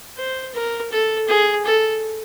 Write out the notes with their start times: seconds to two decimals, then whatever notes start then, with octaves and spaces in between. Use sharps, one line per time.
0.18 C5
0.54 A#4
0.92 A4
1.28 G#4
1.65 A4